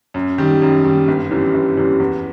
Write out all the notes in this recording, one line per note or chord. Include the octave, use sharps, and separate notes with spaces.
F#2
D#3 G3
F#2
D#3 G3
G1
F#2 E3 G3
G1
F#2 E3 G3
E2